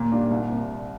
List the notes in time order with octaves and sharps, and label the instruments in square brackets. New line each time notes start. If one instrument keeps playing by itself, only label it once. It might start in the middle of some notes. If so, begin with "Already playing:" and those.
Already playing: [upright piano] D#2 [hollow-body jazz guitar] A#2
[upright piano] D#3 G3 A#3 D4
C2
C4